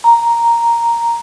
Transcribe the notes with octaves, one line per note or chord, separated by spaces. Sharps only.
A#5